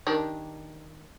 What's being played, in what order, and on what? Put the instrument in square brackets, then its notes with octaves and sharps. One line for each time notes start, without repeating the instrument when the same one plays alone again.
[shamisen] D#3 D4 G4